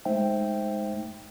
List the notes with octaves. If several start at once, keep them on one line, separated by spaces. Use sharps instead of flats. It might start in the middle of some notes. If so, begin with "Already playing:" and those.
G#3 A3 D#4 C5 E5 G5